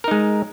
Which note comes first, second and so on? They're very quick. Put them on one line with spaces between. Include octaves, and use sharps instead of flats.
A#4 D#4 G#3